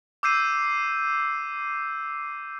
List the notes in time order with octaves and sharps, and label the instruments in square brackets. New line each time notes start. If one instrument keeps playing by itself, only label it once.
[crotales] D6 E6 G6 C7 D#7